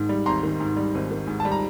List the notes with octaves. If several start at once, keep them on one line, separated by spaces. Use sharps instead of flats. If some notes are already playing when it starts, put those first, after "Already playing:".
Already playing: G#1 G#2 D#3
G3
G#1 A#5 C6
D#3
G#2
G3
G#1
D#3
G#2
A5
G3
A#5